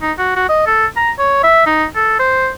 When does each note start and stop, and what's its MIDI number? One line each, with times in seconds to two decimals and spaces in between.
0.02 0.12 63
0.19 0.33 66
0.36 0.46 66
0.49 0.63 75
0.67 0.86 69
0.96 1.11 82
1.19 1.42 73
1.43 1.66 76
1.66 1.84 63
1.96 2.15 69
2.19 2.50 72